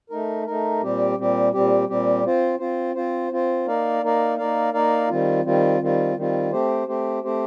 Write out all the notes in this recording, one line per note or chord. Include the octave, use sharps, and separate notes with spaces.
A3 D#4 A#4
A3 D#4 A#4
A#2 G3 C4 G4
A#2 G3 C4 G4
A#2 G3 C4 G4
A#2 G3 C4 G4
C4 F4 C5
C4 F4 C5
C4 F4 C5
C4 F4 C5
A#3 D#4 A#4 D5 F5
A#3 D#4 A#4 D5 F5
A#3 D#4 A#4 D5 F5
A#3 D#4 A#4 D5 F5
D#3 G3 C4 F4
D#3 G3 C4 F4
D#3 G3 C4 F4
D#3 G3 C4 F4
A3 C4 G4 C5
A3 C4 G4 C5
A3 C4 G4 C5